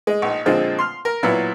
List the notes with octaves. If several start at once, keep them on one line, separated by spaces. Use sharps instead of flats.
G#3
A#1 D#4
A#2 D3 F3 G#3 C4
C6 F6
A#4
A#2 F#3 B3 E4